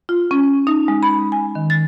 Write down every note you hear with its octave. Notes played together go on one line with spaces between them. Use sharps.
F4
C#4
D#4
G#3
B5
G#5
D#3
A6